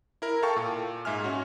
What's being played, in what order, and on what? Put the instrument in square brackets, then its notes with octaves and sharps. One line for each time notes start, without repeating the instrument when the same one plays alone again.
[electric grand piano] E4 A#4
A4 F5 G5 A5 C#6
A#2
G#2 E5 G#5 F6
C#4 F#4